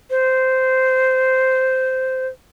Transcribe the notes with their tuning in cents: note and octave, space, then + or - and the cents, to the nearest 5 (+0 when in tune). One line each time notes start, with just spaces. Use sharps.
C5 -10